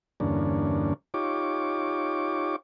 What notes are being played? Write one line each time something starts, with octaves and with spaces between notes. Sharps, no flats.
E2 G2 D3 A#3 C#4 D4
D#4 F4 G4 C#5 D6